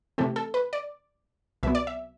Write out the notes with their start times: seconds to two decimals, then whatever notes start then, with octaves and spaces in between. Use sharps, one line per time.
0.18 C3 E3 A3 C4 A4
0.36 A4
0.54 B4
0.73 D5
1.63 C2 B2 F#3 B3 E5
1.75 D5
1.87 E5